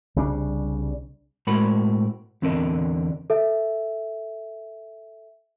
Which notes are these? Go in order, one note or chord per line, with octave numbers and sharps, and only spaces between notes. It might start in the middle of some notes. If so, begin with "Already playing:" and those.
C2 C#3 G3 D4
A2 G#3 C4 F#4 A#4 B5
E2 D3 C4 D4 A#4 D#5
A4 E5